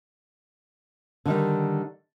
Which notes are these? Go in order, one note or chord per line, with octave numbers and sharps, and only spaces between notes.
D3 D#3 G3